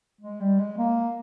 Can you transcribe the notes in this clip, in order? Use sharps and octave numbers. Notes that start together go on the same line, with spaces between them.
G#3
G3
G#3
A#3